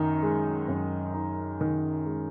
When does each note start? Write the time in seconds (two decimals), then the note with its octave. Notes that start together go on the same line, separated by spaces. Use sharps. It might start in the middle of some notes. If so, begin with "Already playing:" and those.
Already playing: F#2 D#3 D#4
0.23 G#3
0.68 F#2
1.14 D#4
1.61 D#3
2.06 G#3